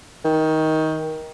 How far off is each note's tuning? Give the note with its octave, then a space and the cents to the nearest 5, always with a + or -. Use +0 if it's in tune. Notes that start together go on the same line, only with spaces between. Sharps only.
D#3 +20